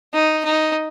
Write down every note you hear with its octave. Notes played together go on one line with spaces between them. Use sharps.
D#4
D#4